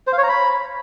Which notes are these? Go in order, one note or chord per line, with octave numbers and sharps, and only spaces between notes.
C5
F5
C#5
A#5
B5